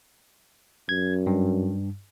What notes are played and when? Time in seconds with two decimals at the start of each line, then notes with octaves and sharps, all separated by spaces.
0.89 F#2 G#6
1.27 G2